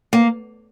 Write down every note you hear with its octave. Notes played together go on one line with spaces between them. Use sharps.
A#3